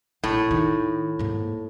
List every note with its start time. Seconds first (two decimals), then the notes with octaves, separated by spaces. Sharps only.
0.24 A#1 A2
0.51 D#3
1.19 G#2 A#3